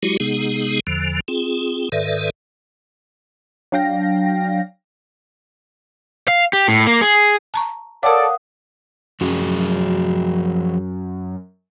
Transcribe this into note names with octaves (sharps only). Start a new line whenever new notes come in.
F#3 G#3 E4 F#4 G4
C3 G#3 B3 D#4 G#4
E2 D3 F3
C4 F4 G#4
G#2 D#3 A4 B4 D5 E5
F#3 D4 F5 G5 A#6
F5
G4
A2
A#3
G#4
A5 A#5 C#6
A4 A#4 C#5 D5 F5 F#5 D#6
F#2 F3 F#4 G#4